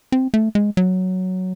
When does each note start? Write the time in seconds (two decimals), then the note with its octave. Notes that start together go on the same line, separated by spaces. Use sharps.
0.12 C4
0.34 A3
0.55 G#3
0.77 F#3